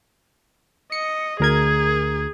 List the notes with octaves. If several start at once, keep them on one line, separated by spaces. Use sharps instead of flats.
D#5 C#7
D2 G#4 A#4 G#6